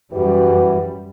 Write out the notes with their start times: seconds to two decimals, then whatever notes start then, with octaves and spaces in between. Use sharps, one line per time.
0.12 F#2 E3 G3 F#4 B4